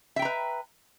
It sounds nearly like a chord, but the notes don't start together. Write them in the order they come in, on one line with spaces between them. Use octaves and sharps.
E5 G5 A#5 B4